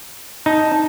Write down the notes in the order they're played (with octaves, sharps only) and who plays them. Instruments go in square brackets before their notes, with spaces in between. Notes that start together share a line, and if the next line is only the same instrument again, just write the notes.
[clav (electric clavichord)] D#4 [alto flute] A5